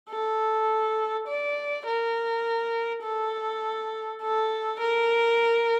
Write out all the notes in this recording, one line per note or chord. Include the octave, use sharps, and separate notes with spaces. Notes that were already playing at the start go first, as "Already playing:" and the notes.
A4
D5
A#4
A4
A4
A#4